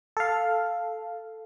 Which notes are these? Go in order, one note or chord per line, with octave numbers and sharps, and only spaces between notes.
A4 F5